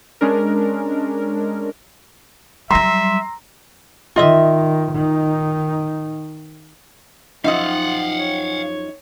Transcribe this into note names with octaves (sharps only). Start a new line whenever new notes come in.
G#3 C#4 D4 A#4
F#3 G3 E5 A#5 C6 E6 A#6
D#3 F4 D#5 E5
D#3 D#4
F#2 F3 D#4 F4 D#5 F5 F#5 E6
C#5